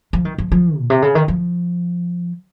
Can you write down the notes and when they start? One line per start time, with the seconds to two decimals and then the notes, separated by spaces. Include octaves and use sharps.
0.13 F3
0.25 D#3
0.38 F3
0.52 F3
0.78 A#2
0.90 C3
1.02 C#3
1.15 D#3
1.28 F3